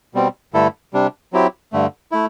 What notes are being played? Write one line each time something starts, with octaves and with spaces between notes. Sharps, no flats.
B2 G3 C4
G2 D3 A3 E4 A4
C3 G3 D4
F#3 C4 E4 G4
G2 D3 A3
A3 E4